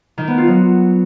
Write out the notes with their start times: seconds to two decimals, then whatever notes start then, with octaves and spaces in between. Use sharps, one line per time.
0.18 D#3
0.28 B3
0.38 F4
0.48 F#3